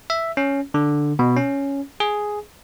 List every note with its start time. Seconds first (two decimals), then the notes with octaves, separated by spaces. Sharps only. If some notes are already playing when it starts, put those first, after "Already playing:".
0.10 E5
0.37 C#4
0.74 D3
1.19 B2
1.36 C#4
2.00 G#4